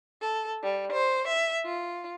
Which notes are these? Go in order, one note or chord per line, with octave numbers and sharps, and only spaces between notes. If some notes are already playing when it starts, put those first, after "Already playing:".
A4
G3
C5
E5
F4